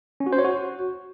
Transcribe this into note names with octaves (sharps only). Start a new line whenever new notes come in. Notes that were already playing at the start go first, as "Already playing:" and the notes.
C#4
F#4
C5
C#5
F#4